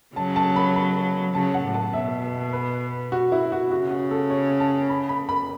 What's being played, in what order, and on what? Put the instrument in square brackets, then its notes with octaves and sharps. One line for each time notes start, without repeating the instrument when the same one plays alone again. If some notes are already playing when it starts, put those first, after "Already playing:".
[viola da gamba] C#3 F#3 [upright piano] A5
[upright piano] A5
B5
B5
[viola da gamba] C#3 F#3 [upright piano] A5
[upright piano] F#5
[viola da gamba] A2
[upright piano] A5
[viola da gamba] B2 [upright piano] E5
[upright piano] B4
F#4
E4
F#4
[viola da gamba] C#3 [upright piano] F#4
[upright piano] F#4
A4
C#5
A5
B5
B5
B5